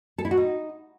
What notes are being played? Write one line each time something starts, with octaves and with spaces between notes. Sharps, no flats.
A4
E4
F#4
D#4